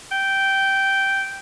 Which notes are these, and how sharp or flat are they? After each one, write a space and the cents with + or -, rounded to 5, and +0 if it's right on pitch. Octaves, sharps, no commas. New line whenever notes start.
G5 -10